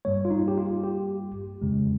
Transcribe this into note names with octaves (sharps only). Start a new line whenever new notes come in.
G2 G3 A#3 C#5
F4
D#4
G4
F4
G4
F2 C#3 G#3